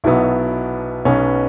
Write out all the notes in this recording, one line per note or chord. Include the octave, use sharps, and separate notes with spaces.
B1 B2 F#3 B3 E4
B1 B2 B3 C#4